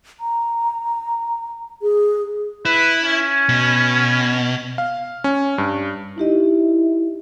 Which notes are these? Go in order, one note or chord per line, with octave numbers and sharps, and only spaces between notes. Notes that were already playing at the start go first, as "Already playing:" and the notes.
A#5
G#4
E4 B4
C#4
B2
F5
C#4
G2
D#4 E4 G4 D#5